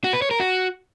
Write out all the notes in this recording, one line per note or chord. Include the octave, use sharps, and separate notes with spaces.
F#4
B4
C#5
A#4
F#4